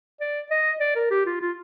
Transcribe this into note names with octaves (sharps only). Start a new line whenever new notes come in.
D5
D#5
D5
A#4
G4
F4
F4